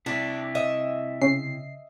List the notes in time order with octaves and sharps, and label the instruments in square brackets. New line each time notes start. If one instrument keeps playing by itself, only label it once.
[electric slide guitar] C3 E4 [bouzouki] D4
[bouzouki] D#5 E5
[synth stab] C#3 C7